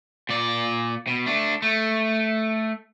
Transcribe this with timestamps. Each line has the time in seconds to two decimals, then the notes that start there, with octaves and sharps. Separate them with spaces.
0.29 A#2 D5
1.07 B2
1.26 A3 D4
1.62 A3